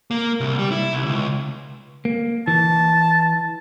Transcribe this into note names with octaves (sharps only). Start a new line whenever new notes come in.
A#3
C2
G3
E4
C2
C#2
A#3
E3 A5